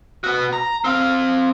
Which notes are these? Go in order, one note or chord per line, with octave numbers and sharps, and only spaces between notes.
B3 F#4
A#5
C4 F5